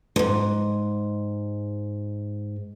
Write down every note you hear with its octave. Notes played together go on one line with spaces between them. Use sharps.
D2 G#2